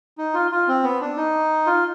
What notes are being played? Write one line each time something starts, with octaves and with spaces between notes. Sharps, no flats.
D#4
F4
F4
C4
B3
D4
D#4
F4